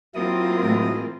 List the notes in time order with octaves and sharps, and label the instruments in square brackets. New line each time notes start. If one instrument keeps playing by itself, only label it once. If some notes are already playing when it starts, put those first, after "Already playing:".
[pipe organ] F#3 E4 D#6 [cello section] A#3 C4 F4 [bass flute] A#4
[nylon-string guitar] A2 E3 G#3